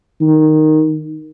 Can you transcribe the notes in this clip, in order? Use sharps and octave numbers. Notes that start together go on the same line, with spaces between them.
D#3